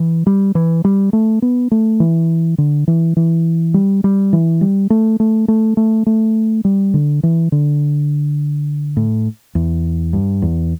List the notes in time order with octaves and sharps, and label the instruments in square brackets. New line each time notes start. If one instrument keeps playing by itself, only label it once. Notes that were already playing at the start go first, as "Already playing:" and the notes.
Already playing: [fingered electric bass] E3
G3
E3
G3
A3
B3
A3
E3
D3
E3
E3
G3
G3
E3
G3
A3
A3
A3
A3
A3
G3
D3
E3
D3
A2
E2
G2
E2